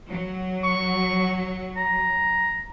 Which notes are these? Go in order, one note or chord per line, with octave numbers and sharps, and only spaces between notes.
F#3
C#6
A#5